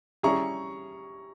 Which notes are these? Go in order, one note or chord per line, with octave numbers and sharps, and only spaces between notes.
G3 C#4 E4 G#4 A#5 C#6